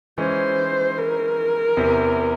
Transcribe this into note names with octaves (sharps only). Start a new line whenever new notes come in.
E3 G#3 C#4 C5
A#4
E2 C3 E3